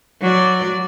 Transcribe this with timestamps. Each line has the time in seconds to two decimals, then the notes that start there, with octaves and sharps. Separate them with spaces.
0.22 F#3 D5